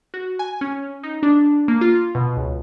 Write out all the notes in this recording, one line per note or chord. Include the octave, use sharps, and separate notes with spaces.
F#4
G#5
C#4
D#4
D4
A#3
F4
B2
C#2